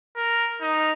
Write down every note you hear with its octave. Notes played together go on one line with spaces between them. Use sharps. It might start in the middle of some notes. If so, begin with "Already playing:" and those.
A#4
D#4